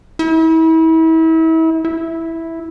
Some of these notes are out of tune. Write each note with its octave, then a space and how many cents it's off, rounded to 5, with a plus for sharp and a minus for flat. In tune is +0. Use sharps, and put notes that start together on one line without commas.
E4 -35
E4 -5